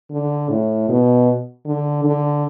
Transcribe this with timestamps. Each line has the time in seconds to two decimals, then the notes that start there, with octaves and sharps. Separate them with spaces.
0.11 D3
0.49 A2
0.89 B2
1.66 D3
2.04 D3